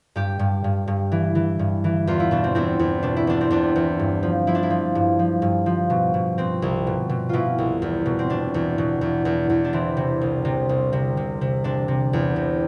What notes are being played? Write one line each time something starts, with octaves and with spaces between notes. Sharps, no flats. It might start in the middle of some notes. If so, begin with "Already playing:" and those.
G2 G4
G2
G2
G2
E3
E3
G2
E3
E2 F4
E4
B2 D4
C4
E2 C4
E2
B2 D4
E4
E2 D4
C4
E2 D4
E2
G2
F3
F3 E4
D4
E4
F3
G2
F3
G2
F3
B2
B2
B2 C4
C2
B2
B2
B2 E4 F4
C2
E2
B2
C4
B2 D4
E2
B2
E2
E2
E2
D4
E3 C4
C3
C2
C3
C2
C3
C3
C3
C3 D4
C3
E2
C3